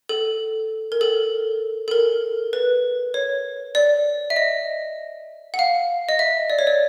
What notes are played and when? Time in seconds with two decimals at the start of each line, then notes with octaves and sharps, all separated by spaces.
0.09 A4
0.92 A#4
1.01 A4
1.88 A4
1.91 A#4
2.53 B4
3.14 C#5
3.75 D5
4.30 E5
4.36 D#5
5.54 F#5
5.59 F5
6.09 D#5
6.19 E5
6.50 D5
6.59 C#5
6.67 D5